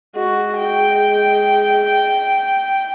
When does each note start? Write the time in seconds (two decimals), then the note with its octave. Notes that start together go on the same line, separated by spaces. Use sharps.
0.15 G#3 F#4
0.59 G5